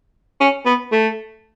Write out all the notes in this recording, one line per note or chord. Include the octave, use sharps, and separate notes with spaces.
C#4
B3
A3